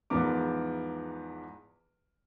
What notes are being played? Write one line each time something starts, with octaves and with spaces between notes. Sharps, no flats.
E2 G#2 F3 B3 A#4 D6